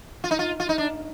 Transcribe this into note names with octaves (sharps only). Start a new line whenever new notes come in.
F4
D#4
F4
F4
D#4
D4